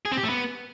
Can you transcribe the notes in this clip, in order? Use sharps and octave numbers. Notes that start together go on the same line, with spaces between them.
G#4
C4
G4
A3
B3